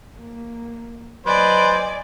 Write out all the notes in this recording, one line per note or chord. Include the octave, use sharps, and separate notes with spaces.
A#3
F#3 B4 C5 D5 D#5 G#5